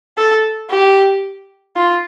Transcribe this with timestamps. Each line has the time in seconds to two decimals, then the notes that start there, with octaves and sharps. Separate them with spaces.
0.18 A4
0.70 G4
1.77 F4